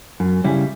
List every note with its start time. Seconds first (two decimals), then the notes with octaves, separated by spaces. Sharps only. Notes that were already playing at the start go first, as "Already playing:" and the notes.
0.20 F#2
0.44 C#3 G3 C#4 E4